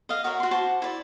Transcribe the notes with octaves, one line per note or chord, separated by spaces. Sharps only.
D#5 F5
F#4 A#4 C#5 E5
F#4 C6
F#4 C5 A5 D6
E4 D5